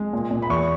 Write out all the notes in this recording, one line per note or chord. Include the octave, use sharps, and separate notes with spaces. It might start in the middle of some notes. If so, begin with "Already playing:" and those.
Already playing: G#3
A#2
A#2
B5
E2 C#6